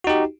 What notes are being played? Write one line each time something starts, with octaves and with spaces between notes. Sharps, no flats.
D#4 F#4 G4